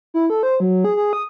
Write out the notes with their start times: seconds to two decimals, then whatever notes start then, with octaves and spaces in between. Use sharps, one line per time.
0.14 E4
0.30 A4
0.43 C5
0.60 F#3
0.85 G#4
0.97 G#4
1.13 D#6